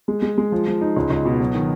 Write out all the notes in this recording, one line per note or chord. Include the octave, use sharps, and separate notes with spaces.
G#3
G#3
G#3
F3
F3
D#4
C#2
C#2
B2
F#3
D#3